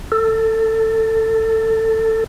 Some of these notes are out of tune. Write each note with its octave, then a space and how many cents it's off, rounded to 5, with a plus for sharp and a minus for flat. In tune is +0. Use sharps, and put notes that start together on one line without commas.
A4 +20